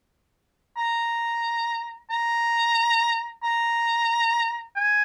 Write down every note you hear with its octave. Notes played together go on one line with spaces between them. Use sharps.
A#5
A#5
A#5
G#5